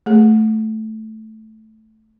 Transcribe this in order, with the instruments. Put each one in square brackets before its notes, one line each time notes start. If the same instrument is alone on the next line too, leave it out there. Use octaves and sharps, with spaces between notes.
[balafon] A3 G#4